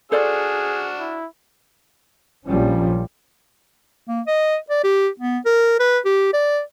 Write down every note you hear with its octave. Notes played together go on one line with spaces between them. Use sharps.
D4 F#4 G#4 A4 C5 D5 F6
E4
A#1 F3 G3 C#4
A#3
D#5
D5
G4
B3
A#4
B4
G4
D5